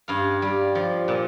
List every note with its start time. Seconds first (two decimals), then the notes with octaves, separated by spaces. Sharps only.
0.08 G2 F5
0.42 G3
0.75 F3
1.08 A#2